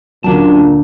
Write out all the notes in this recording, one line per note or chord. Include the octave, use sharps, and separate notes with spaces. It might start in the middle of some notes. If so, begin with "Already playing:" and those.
D2 A#2 F#3 A#3 C#4 D4 A5